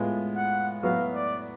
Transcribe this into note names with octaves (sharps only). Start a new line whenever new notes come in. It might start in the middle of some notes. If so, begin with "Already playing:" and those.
Already playing: A2 G#3 B3 F4
F#5
A2 F#3 B3 F#4 B4 F5
D5